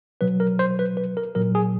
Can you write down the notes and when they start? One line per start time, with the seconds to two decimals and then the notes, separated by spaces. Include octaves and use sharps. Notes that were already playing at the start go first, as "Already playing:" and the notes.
0.21 B2 F#3 B4
0.40 A#4
0.59 C5
0.79 B4
0.97 B4
1.17 A#4
1.35 A#2 F#3 A#4
1.55 G#4